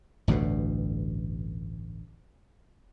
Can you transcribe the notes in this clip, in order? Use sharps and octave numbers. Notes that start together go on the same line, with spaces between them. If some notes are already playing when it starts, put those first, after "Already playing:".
A1 D2 G2 B2